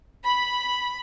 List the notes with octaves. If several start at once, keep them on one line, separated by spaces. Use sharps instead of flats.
B5